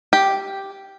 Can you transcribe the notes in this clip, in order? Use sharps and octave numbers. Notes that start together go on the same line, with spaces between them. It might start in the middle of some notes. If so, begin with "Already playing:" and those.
G4